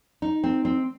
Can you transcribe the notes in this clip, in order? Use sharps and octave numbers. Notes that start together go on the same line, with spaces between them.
D#4
C4
C4